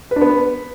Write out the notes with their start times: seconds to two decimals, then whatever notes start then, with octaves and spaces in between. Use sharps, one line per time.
0.11 B4
0.16 D4
0.21 B3